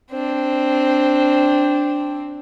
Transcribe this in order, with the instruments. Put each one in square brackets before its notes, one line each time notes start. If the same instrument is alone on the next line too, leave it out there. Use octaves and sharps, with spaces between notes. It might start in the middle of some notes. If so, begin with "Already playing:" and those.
[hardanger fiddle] C4 D4